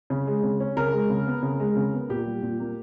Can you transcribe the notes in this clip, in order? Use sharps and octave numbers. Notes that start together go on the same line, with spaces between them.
C#3
G#3
C#3
C#4
C#3 A#4
G#3
C#3
B3
C#3
G#3
C#3
B3
A#2 G4
G3
A#2
A#3